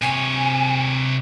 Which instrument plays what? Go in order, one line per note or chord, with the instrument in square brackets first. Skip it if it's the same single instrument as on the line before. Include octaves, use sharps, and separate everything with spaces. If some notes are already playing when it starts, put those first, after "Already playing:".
[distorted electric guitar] C3 C#5 [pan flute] G#5